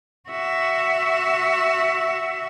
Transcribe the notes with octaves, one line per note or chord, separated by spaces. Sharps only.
F#4 E5